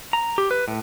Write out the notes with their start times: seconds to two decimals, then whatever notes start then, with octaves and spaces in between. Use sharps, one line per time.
0.13 A#5
0.38 G4
0.51 B4
0.68 A2